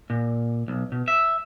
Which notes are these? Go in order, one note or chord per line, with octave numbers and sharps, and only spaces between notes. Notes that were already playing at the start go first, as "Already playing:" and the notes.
A#2
B1
B2
E5